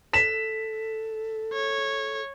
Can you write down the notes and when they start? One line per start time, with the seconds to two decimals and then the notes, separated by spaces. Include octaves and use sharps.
0.13 A4 B6 E7
1.53 C#5